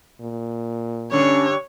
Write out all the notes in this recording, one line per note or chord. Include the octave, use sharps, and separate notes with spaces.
A#2
G2 D3 C#4 C#5